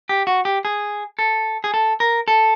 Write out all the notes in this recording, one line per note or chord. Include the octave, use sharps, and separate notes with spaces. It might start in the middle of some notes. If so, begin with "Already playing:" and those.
G4
F#4
G4
G#4
A4
G#4
A4
A#4
A4